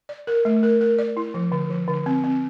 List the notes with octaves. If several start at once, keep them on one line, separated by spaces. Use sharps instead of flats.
D5
A#4
A3
A#4
A#4
D5
E4
F3
D3
F3
D3
C4
C4